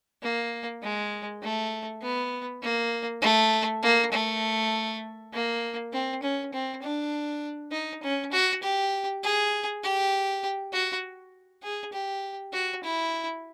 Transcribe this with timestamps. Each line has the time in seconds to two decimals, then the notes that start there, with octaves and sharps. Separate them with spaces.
0.23 A#3
0.82 G#3
1.43 A3
2.02 B3
2.62 A#3
3.22 A3
3.83 A#3
4.12 A3
5.33 A#3
5.92 C4
6.23 C#4
6.53 C4
6.82 D4
7.72 D#4
8.03 C#4
8.32 F#4
8.63 G4
9.23 G#4
9.83 G4
10.73 F#4
11.63 G#4
11.93 G4
12.53 F#4
12.84 E4